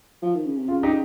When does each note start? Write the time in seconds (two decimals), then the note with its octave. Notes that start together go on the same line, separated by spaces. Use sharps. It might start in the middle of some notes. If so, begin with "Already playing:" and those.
0.22 F3
0.35 D#3
0.46 C#3
0.57 C3
0.68 C#3 F4
0.83 D#4 G4